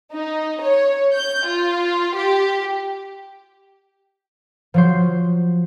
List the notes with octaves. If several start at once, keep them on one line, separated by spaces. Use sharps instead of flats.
D#4
C#5
G6
F4
G4
F3 F#3 C5